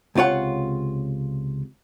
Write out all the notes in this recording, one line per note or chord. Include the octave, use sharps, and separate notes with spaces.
C#2 C3 F4 C#5 F#5